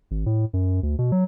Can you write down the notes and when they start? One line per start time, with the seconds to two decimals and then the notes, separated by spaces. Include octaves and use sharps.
0.11 G#1
0.26 A2
0.53 F#2
0.83 D2
0.99 B2
1.12 F#3